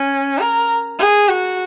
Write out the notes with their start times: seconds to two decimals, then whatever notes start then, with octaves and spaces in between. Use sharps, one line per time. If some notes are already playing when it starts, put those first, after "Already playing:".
Already playing: C#4
0.39 A#4
0.99 G#4
1.28 F#4